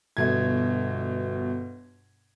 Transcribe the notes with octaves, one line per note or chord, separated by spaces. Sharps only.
G1 B2 G#6